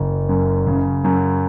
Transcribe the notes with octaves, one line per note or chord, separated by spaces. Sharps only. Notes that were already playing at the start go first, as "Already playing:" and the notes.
Already playing: F#1
F#2
C#3
F#2